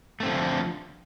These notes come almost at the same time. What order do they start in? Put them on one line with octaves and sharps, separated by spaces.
A3 C4 D3 F3